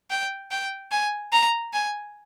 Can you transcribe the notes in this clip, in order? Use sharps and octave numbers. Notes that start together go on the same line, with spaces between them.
G5
G5
G#5
A#5
G#5